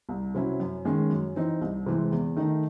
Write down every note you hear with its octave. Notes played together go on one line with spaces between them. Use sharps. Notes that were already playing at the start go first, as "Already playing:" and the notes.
C2
C3 F#3 C#4 E4
F#2
D#3 G#3 C#4
F#2
E3 C4 D#4
C2
C3 E3 G#3
E2
D#3 A3 D#4